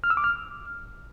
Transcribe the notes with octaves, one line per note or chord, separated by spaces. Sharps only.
F6
E6
D6
F6